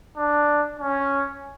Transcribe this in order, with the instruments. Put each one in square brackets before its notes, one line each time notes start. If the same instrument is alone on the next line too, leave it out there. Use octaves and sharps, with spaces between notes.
[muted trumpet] D4
C#4